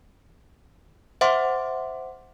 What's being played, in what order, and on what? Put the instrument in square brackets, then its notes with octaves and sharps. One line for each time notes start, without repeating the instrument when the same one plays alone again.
[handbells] C5 E5 F#5 C6 D6